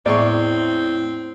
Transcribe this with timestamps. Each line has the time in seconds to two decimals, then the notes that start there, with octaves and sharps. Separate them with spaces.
0.06 E2 A2 G#3 C4 D5 C#6